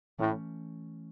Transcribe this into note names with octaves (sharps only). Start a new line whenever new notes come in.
A2 E3 A3 C#4